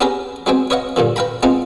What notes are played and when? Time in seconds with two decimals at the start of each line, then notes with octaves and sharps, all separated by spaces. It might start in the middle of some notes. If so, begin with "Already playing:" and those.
0.01 B3 C#4 G4 G#4 A#4 B4
0.46 F#3 G#3 B3 C4 G5
0.70 B4 C#5 D#5 F5 F#5
0.96 G2 A#2 D3 E3
1.16 B4 F5 G5 A#5 B5
1.43 G#3 B3 C4 D#4 F4